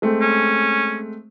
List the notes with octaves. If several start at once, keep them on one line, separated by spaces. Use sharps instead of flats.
G#3 A3 C4
C#4